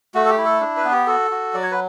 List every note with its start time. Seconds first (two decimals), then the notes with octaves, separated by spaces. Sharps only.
0.14 A3 F#4
0.25 A4
0.29 G4
0.38 E4
0.45 A4
0.60 D4
0.77 B4
0.84 B3
0.92 G4
1.07 F#4 A4
1.31 F#4
1.54 F#3 D5
1.63 C#5
1.71 B4